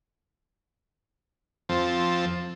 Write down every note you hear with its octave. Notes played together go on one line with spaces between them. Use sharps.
F2 F3 C4 A4